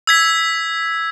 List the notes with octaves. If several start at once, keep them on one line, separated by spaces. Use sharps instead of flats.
E6 G#6 B6